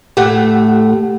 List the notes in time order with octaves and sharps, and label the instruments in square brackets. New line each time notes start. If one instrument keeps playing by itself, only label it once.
[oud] A2 A3 [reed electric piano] G4 F#5